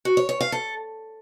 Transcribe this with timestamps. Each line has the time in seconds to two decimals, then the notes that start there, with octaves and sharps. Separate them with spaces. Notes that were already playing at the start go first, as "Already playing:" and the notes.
0.05 F#4
0.17 C#5
0.29 C#5
0.41 F5
0.52 A4